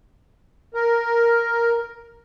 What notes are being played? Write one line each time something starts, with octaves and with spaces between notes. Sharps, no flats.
A#4